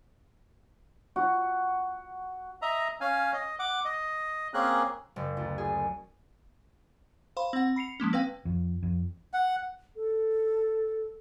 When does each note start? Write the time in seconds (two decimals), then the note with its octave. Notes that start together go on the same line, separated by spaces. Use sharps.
1.16 F#4
2.62 D#5 E5 A#5
3.01 C#4 F5 G#5
3.33 D#5
3.59 F#5 D6
3.85 D#5
4.54 A#3 C4 C#4 G#4 A#4 F#6
5.16 F#1
5.37 D2
5.58 G#4
7.37 C5 F5 B5 C6
7.53 C4 F#5
7.76 B5 C7 C#7 F7
8.00 F3 G#3 A#3 C#4
8.13 C4 B4 F5 G5
8.45 F2
8.83 F2
9.34 F#5
9.96 A4